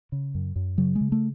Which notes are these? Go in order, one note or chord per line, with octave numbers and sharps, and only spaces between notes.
C#3
F#2
F#2
C#3 F#3
G#3
C#3
A3